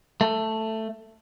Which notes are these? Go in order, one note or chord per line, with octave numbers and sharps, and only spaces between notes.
A3